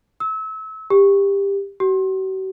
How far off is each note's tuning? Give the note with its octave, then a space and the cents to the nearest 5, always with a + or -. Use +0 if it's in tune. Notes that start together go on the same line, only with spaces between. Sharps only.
E6 -30
G4 +20
F#4 +45